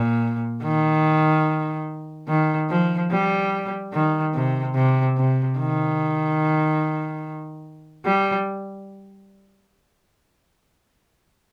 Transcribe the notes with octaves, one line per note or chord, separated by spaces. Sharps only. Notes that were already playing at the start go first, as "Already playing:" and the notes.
Already playing: A#2
D#3
D#3
F3
G3
D#3
C3
C3
C3
D#3
G3